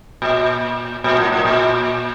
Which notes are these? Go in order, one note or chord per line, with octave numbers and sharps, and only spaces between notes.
A#2
A#2
A2
A2
A#2